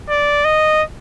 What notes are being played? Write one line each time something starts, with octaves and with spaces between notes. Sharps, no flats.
D5
D#5